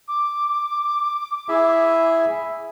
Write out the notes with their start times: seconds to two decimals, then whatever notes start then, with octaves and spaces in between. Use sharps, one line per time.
0.08 D6
1.49 E4 G#4 E5